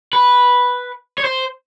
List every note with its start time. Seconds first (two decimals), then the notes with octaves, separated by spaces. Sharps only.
0.13 B4
1.18 C#5
1.24 C5